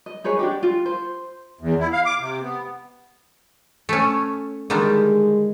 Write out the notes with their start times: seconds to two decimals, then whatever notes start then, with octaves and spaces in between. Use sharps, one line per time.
0.06 D#5
0.24 D#4 G#4 B4 C#5
0.39 D4 F#4 G4
0.63 F4
0.86 C5
1.61 E2
1.79 E4
1.92 F5
2.05 D6
2.19 C3
2.41 B3
3.89 A3 C#4
4.70 D3 D#3 G3 G#3